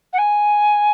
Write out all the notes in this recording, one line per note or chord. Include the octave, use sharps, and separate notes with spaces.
F#5
G#5